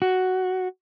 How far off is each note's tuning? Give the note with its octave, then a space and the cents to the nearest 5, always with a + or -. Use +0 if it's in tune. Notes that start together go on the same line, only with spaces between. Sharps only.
F#4 +5